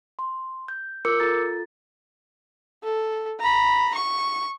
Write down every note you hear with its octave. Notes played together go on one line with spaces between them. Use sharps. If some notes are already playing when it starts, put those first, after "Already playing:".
C6
G6
F4 A#4 D6 E6 G6 C#7
F4 A4 A#5 A6
A4
A#5 B5
C#6